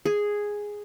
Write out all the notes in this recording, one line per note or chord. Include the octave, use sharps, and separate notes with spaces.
G#4